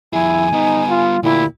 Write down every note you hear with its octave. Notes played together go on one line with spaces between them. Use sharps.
F2 E4 G#4 G#5
G3 B3 D#4
F4
D2 A#2 E4 G4